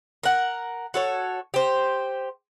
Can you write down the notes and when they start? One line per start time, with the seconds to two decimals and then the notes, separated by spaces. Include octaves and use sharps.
0.23 A#4 F#5
0.94 F#4 A4 C#5
1.54 G4 C5